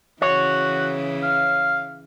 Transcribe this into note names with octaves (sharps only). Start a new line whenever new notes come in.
C#3 E3 F#4 C#5
F5